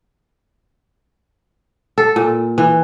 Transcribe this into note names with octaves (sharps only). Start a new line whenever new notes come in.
A4
A#2
E3